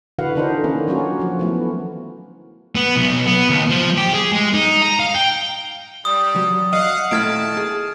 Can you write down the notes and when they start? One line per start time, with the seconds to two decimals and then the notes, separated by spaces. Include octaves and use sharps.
0.18 D3 E3 F#4 B4 F5 F#5
0.35 D3 E3 D4 D#4 A#4 C5
0.64 D#3 A#3 C#4
0.87 F#3 A#3 C#4 F4 F#4
1.20 F3 F#4
1.39 E3 A3 B3
2.75 B3
2.96 B1
3.27 B3
3.50 D#2
3.70 F3
3.97 G4
4.14 G#4
4.32 G#3
4.54 D#4
4.82 A#5
5.00 F5
5.14 G5
6.05 G3 D#6
6.36 F#3
6.73 D#5 F5 F#5
7.11 A#2 D#3 A3 E4 A5 F6 G#6 D7
7.57 G#4